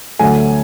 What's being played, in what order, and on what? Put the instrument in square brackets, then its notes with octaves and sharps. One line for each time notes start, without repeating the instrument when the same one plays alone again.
[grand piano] D2 D3 F#3 A3 G#5